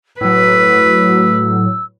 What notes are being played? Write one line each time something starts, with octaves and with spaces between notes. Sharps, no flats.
A2 F#3 B4 E6